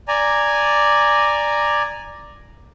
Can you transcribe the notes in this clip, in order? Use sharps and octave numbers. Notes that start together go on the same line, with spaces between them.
D5 G#5 A#5